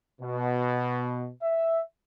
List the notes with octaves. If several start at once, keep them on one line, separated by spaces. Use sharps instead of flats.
B2
E5